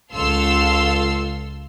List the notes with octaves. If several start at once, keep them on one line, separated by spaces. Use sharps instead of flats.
C#2 A4 F5 C6 E6